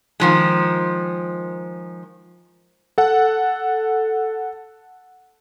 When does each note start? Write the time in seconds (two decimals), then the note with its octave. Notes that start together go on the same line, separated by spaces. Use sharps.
0.20 D#3 F3 G#3
2.98 A4 F#5